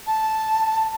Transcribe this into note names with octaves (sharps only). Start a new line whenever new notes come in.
A5